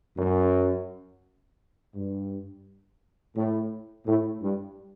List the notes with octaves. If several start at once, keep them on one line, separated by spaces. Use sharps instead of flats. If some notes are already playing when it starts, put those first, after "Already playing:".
F#2
G2
A2
A2
G2